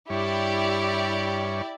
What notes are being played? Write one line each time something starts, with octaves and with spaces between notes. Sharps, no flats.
G2 E4 G4 C#5 D5